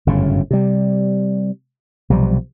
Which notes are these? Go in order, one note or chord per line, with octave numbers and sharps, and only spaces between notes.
G1 F#2 A2 C#3
C3 G3
B1 C3 F3 G3